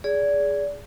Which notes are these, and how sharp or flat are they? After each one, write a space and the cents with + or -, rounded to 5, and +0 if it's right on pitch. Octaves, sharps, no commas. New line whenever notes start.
G#4 +0 D5 -25